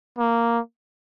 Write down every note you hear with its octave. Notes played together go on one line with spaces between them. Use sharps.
A#3